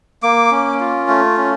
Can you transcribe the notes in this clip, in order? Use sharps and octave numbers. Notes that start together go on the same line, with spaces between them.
A#3 D6
C#4
F4
A3
C#4